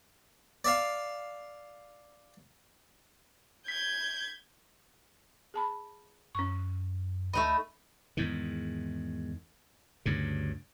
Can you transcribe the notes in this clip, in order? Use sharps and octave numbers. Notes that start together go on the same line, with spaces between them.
D5 E5 F5
G6 G#6 B6
G#4 A5 B5
F#2 C#4 C#6
D2 A3 D#4 D#5 B5
E2 G#2 D#3
D2 G2 C#3